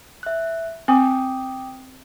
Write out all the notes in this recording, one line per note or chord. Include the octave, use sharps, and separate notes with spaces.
E5 F#6
C4 G5 D6 D#6